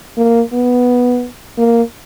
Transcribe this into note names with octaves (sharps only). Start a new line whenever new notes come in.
A#3
B3
A#3